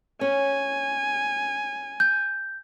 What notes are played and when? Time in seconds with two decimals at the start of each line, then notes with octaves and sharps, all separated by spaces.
0.21 C#4 G#5
2.00 G6